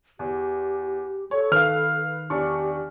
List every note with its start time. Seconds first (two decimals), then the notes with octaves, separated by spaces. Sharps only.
0.19 E2 G4
1.31 A4 C#5
1.52 D#3 B4 F5 F6
2.30 E2 D4 G4 C#6